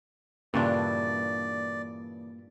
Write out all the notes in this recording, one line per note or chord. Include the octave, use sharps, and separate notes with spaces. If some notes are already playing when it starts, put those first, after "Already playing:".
G2 A#2 C#3 E3 A#3 D4 D5